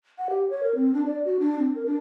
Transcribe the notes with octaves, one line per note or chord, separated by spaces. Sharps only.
F#5
G4
C#5
A#4
C4
D4
D5
F#4
D4
C4
A#4
D4